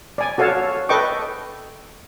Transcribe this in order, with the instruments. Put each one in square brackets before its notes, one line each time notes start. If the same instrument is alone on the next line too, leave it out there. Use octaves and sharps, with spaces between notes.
[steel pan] D5 G#5
F#4 A4 C#5 F5 A5
A4 B4 D#5 G5 C#6 D6